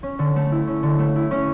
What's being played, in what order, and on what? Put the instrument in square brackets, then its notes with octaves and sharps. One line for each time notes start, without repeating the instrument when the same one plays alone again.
[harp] C#4
D3
A3
E4
C#4
D3
A3
E4
C#4